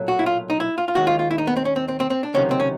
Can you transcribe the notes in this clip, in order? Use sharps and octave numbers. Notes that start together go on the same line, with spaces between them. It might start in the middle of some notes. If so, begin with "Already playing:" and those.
Already playing: B1 A#2 F#3 A3
F#4
E4
F4
D#4
E4
F4
F4
D#2 D#3 G#3 F#4
F4
F4
E4
D#4
B3
C4
C#4
C4
C4
C4
C4
D4
C#2 C3 D#3 F#3 C#4
C4
C#4